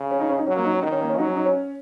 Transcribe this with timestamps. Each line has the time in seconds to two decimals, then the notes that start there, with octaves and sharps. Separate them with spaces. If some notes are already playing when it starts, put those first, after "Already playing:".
Already playing: C#3
0.11 C#4
0.20 D#4
0.29 C#4
0.38 D#4
0.47 F#3 C#4
0.56 A#3
0.65 D#4
0.73 C#4
0.83 D#3 D#4
0.92 C#4
1.01 A#3
1.09 C#4
1.18 F#3 D#4
1.27 C#4
1.36 D#4
1.46 C#4